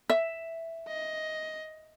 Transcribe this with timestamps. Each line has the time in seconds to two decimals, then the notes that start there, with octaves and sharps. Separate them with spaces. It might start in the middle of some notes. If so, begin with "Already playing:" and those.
0.10 E5
0.88 D#5